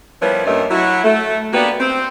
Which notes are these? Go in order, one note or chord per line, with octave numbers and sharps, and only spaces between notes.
F3 G3 B3 E4 A#4 C#5
G2 A#2 A3 C#4 A#4 D#5
F#3 E4 F#4
A3
A#3 B3 D4 F#4 G4 B4
C4